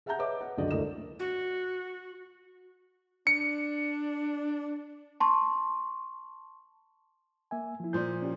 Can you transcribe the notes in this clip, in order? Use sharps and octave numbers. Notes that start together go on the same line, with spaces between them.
G#4 E5 F#5 A5 A#5 G6
G#4 B4 C#5 D#5 E5 D6
B4 F#5
C#2 F#2 D3 F#4 D5 D#5
D2 A3 E4 A#4 D#5 E7
F#4
D4 C#7
A5 C6 C#6
A#3 E5 G#5
F3 E4
A#2 F3 D5 C6 G6
C#4 G4